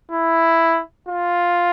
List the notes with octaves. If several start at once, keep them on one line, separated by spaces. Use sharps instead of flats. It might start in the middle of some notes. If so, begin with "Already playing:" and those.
E4
F4